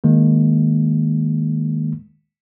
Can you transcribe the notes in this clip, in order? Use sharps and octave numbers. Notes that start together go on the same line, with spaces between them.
D#3 G#3 A#3